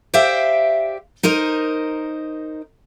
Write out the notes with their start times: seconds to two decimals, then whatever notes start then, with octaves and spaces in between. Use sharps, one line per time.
0.14 G4 C5 D5 E5 F5
1.23 D#4 A#4 C5 D#5